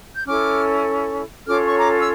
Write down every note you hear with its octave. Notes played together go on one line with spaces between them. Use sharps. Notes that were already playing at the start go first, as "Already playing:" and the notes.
G6
C#4 E4 A4 D6 F6
C#4 F4 A4 C#5 D6 F6
C#6
A#5 D6
E6